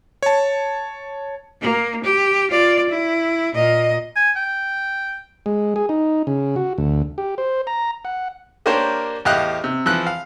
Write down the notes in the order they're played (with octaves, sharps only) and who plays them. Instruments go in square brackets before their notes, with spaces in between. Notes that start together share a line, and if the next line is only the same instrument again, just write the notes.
[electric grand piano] C#5 A5
[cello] A#3
G4
F4 D5
E4
A#2 D#5
[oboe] G#5
G5
[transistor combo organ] G#3
G#4
D#4
C#3
F#4
D2
G4
C5
A#5
F#5
[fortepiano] A#3 D4 G4 A#4 C5 C#5
E2 A2 G4 D#5 F5 F#6
C3
E3 F3 F#6
F5